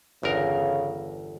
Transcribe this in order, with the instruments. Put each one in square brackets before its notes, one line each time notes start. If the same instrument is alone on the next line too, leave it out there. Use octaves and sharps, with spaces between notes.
[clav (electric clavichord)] G1 E2 A#4 [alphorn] C#3